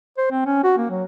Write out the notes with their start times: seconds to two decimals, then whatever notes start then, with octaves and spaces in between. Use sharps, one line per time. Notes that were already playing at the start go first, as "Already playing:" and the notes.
0.18 C5
0.31 C4
0.46 C#4
0.64 F#4
0.77 A#3
0.90 F#3